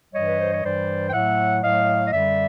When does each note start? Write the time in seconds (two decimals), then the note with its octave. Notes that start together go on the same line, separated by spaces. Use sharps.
0.13 G2 E3 G3 C#5 D#5
0.28 B4
0.40 C5
0.52 C#5
0.64 G2 E3 G3 C5 D5
1.08 G5
1.13 A2 F#3 A3 E5 F#5
1.62 A2 F#3 A3 D#5 F5
2.06 D#5
2.12 F#2 D3 G3 D5 E5